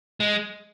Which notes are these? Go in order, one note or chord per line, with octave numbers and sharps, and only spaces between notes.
G#3